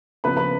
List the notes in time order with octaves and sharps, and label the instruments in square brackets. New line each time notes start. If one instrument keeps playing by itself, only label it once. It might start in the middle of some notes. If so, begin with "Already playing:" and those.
[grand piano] C#3 F3 B3 B4 B5
B4 B5